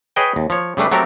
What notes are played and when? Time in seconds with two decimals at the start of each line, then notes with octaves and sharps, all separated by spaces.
0.16 G#4 B4 C#5 D#5 G5
0.36 D#2
0.50 F3 C#5
0.77 C#3 G3 A3 D4 B4
0.92 F#3 A3 C4 G4 A4 A#4